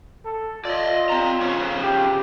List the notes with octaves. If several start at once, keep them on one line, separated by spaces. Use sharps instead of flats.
A4
F4 D5 D#5
C4 A#5
C#3 F3 C#5
G4